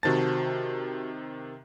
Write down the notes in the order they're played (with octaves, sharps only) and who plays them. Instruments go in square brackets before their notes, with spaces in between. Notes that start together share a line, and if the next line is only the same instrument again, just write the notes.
[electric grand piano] C3 D#3 A6 [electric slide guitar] F#4 C5 A5